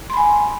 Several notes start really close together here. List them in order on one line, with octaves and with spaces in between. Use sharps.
C6 B5 G#5